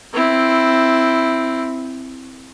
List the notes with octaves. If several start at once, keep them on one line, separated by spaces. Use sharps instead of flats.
C4 E4